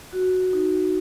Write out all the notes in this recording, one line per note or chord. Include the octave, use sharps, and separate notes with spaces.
F#4
D#4